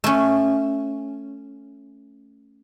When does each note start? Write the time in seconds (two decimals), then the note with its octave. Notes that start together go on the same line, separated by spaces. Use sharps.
0.04 A3 C#4